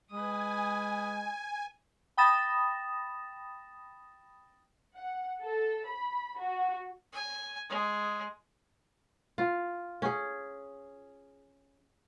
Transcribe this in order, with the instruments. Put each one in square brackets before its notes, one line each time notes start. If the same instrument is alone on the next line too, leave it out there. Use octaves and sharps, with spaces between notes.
[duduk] G#3 [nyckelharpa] B4 D#6 [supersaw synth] G#5
[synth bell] G5 B5 D#6 A6 A#6 E7
[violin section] F#5
A4
B5
F#4
[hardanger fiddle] G#5
G#3
[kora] F4
C#4 G#4